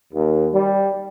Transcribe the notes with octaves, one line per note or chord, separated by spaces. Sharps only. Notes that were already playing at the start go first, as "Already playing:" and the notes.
D#2
G3